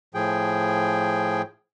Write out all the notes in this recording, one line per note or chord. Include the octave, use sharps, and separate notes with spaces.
A2 F3 G#4 G5